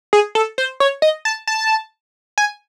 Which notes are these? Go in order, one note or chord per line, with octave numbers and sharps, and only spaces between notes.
G#4
A4
C5
C#5
D#5
A5
A5
G#5